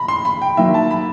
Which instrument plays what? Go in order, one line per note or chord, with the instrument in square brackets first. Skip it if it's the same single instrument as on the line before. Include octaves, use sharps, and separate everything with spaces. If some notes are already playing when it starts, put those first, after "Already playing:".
Already playing: [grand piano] A#5 B5
C6
B5
G5
D#3 F#3 A#3 E5
A5
B5